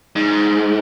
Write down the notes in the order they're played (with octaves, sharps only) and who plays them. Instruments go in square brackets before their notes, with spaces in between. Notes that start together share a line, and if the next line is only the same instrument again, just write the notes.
[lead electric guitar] G#2